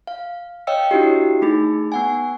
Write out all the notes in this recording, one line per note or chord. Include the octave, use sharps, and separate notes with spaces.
F5
C#5 D#5 F5 G5 E6 C#7
D4 E4 F#4 G4
A3 D#4 G#4
B3 F#5 G#5